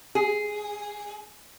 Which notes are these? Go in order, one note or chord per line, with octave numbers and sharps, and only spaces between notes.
G#4